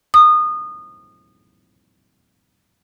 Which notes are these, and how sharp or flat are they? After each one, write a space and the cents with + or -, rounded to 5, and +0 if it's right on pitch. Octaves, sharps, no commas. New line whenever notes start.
D#6 -25